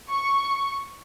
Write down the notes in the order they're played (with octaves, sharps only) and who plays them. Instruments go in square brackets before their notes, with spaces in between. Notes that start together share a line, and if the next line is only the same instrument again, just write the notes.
[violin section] C#6